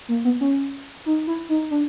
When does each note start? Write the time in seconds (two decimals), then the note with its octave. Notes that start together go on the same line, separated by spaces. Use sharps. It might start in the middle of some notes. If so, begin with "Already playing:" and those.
0.08 A#3
0.25 B3
0.41 C#4
1.06 D#4
1.27 E4
1.49 D#4
1.71 D4